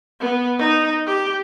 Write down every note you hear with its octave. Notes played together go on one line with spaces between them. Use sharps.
B3
D#4
G4